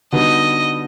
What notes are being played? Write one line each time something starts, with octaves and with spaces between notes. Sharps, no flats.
D3 G3 B3 D#4 F#4 D#5